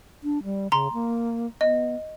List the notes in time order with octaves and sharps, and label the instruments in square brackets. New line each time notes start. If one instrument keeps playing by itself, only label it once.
[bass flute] D4
G3
[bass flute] C#3 [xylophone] A#5 C6
[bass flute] A#3
[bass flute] B3 [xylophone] D#5